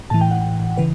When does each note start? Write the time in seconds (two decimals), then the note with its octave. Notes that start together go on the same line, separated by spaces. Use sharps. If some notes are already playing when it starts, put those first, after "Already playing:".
0.10 A2 E3 A5
0.21 G5
0.31 F#5
0.41 G5
0.77 C#3 E3 B4